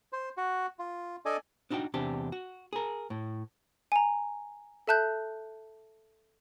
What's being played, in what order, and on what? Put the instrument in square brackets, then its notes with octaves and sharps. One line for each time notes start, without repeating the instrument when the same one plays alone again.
[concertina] C5
F#4
F4
D4 A4 D5 D#5 G#5
[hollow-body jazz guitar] D4 D#4 F#4 D5 G5
E2 C3 D4 G4
F#4
G#4 A#4
A2
[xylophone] G#5 A#5
A4 E5 A5 F#6 G6